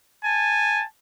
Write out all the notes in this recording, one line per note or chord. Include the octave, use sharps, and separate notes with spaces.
G#5 A5